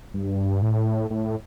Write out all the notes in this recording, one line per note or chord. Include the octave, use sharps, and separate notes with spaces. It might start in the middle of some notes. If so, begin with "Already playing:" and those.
G2
A2
A2